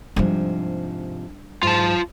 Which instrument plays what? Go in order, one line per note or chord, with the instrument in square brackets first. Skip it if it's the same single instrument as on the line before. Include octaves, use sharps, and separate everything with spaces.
[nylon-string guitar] G#2 C3 F3 [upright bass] G3 D4
[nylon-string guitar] G#2 [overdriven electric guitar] F4 A5